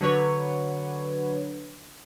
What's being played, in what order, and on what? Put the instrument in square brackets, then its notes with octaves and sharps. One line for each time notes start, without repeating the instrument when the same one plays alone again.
[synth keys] D3 F#3 B4 C#5